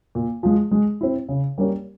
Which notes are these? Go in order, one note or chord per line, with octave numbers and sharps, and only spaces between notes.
A#2
F3 G#3
G#3
C4 E4
C#3
G3 A#3 C#4 G4